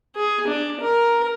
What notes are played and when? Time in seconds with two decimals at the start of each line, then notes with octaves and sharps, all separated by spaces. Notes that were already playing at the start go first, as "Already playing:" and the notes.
0.16 G#4
0.47 D4
0.81 A#4